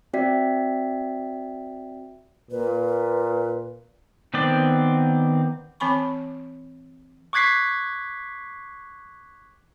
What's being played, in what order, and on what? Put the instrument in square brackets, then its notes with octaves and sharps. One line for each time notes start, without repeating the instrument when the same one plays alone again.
[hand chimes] C4 F#4 D5 E5 G5 B6
[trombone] A#2 [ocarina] B4
[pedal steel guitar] D#3 B3 C4 D5
[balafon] E3 C4 G#5 B5 C#6
[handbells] C#6 D6 F#6 G#6 B6 C7